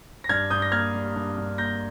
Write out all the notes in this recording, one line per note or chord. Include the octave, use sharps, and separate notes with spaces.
A#6
G2 F6 G#6
G2 D#6 G6
A#6
A#3 F6 G#6
G3
G2
G2
A#3 G6 A#6